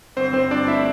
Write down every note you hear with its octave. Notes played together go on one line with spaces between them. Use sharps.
G1 C4 C5
G1 C4 C5
G2 D4 D5
A3 E4 E5